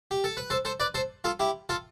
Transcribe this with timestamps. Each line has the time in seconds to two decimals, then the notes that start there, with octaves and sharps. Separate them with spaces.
0.11 G4
0.24 A4
0.37 B4
0.50 A4 C5
0.65 A4 C5
0.80 B4 D5
0.94 A4 C5
1.24 F4 A4
1.40 E4 G4
1.69 F4 A4